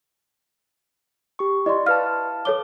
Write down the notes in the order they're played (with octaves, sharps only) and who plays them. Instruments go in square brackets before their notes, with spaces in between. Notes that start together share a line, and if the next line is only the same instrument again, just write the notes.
[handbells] G4 C#6
[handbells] E4 D5 [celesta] D#5 C6
[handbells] E4 B4 A5 [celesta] F5 F6
[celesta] A4 C#5 G7 [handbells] D6